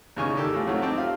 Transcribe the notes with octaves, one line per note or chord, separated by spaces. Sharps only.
E2 A#2 C#3 D#4 G#5 C#6
D#3 G4 A4
A2 G#3 F4 D6
F3 F#3 A3 C4 F4 F#4
C4 D#4 G5 A5 D6
F4 G4 F5